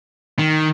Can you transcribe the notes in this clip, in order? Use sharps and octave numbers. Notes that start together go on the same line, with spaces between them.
D#3